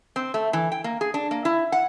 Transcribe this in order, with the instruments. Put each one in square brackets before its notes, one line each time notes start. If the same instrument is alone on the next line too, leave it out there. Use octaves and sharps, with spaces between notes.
[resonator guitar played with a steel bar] C4
A3
E3
G5
A#3
G#4
D4
A#3
E4
F#5